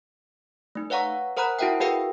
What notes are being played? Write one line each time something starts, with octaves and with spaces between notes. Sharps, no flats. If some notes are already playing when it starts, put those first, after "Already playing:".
A3 D#4
B4 C#5 F5 F#5 A#5 C#6
A#4 C5 F#5 A#5 B5 F#6
E4 F#4 A#4 E5 F#5 G5
F#4 G#4 A#4 B4 F5 G5